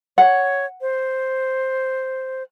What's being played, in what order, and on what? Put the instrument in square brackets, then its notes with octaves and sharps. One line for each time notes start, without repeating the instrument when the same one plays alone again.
[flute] C#5 [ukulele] F#5
[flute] C5